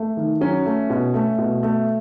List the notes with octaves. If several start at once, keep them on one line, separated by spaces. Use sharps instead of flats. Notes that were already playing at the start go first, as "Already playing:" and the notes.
Already playing: A3
D#3
F#3 C#4
A3
B2
A3
B2
A3